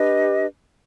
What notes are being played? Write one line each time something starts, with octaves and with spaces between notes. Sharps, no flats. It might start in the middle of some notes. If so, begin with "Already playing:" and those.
Already playing: D4 G4 B4 D#5